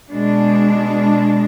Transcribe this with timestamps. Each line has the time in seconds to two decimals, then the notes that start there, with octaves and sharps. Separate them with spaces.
0.11 B2 G#3 D4